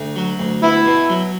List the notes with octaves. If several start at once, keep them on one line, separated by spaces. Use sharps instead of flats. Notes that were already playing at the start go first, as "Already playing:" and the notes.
Already playing: D2
F#3
D2
B3 E4
B2
F#3